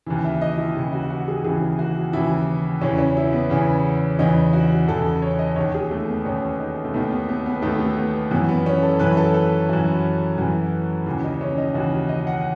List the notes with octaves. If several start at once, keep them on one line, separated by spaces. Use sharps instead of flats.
D#2 C#3 E3
E5
D#5
E4
D#2 C#3 E3
F#4
F#4
G#4
D#2 C#3 E3 G#4
F#4
D#2 C#3 E3 E4
E2 C#3 E3 C#4
C#4
E4
B3
E2 C#3 E3
E2 C#3 E3 D#4
F#4
E2 C#3 E3 A4
C#5
D#5
D#2 D#3 C#5
G#4
A3
B3
D#2 D#3 C#4
D#4
A3
D#2 D#3 B3
B3
B3
B3
D#2 D#3 A3
A3
B3
F#2 E3 B3
B3
C#4
A4
F#2 E3 B4
A4
A4
F#2 E3 F#4
F#2 E3
D#2 C#3 E3
D#4
C#4
D#4
D#2 C#3 E3 F#4
D#5
F#5